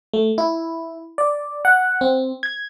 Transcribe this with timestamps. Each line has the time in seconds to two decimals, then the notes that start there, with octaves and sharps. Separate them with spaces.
0.13 A3
0.38 E4
1.18 D5
1.65 F#5
2.01 C4
2.43 G#6